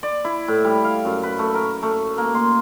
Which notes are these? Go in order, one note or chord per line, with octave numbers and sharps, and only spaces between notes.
D5
E4
A2
G3
F5
F#2
B4
A3
A#4
A3
A#3
C6